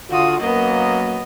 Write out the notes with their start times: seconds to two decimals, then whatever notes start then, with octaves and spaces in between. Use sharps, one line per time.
0.10 D3 F4 F#4 D#6
0.39 F#2 F#3 A#3 B3 D#5